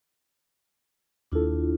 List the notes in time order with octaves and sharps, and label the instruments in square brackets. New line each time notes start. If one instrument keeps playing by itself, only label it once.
[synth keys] D#2 A4 [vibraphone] D4 E4 F4